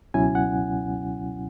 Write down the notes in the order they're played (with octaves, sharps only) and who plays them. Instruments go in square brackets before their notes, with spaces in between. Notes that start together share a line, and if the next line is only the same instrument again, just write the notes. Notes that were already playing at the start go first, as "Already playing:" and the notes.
[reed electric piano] C#2 B2 F#3 C#4 E4 G#5
F#5